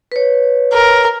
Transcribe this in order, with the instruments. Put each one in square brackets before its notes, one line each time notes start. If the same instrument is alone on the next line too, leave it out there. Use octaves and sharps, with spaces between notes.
[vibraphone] B4 C#5
[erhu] A#4